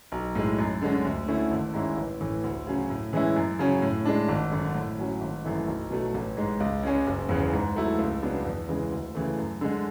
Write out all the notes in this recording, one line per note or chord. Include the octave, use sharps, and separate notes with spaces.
B1
A2 G#3
F#2
D3 G#3 C#4
D2
D3 A3 C#4 E4
G#1
G#2 G#3 C#4 E4
A1
A2 E3 A3
D2
C#3 F#3 C#4
A2
E3 G#3 C#4 E4
F#2
C#3 F#3 C#4
A2
G#3 D4
G#1
F#2 D3
A2
F#3 C#4
G#1
F#2 E3 A3 E4
B1
B2 F#3 A3
A1
G#2 G#3
C#2
C#3 G#3 C#4
F#1
E2 C#3
G#2
F#3 A3 E4
C#2
C#3 F#3 B3 D4
E2
C#3 E3 G#3
D2
C#3 E3 A3
F#2
D3 G#3